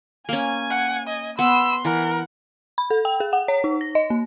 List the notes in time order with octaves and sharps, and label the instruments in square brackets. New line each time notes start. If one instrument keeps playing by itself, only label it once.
[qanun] A#3 C#4 [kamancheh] G#5
[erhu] F#5
D#5
[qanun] B3 [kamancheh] B5 C6 [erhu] E6
[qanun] E3 [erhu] A#4 [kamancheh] F#5
[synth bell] B5
A4
G5
G#4
F#5
C#5
D#4
A#6
D#5
A#3